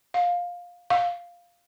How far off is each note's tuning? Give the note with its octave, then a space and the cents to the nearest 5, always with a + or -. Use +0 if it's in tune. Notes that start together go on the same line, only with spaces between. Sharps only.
F5 +15
F5 +0